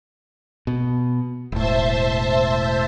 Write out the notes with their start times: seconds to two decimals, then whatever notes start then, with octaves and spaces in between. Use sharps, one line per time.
0.67 B2
1.52 E1 A2 C5 E5 A5